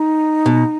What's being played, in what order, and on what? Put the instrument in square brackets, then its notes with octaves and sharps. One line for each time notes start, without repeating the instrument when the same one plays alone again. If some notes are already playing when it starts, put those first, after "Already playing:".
Already playing: [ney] D#4
[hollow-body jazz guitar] B2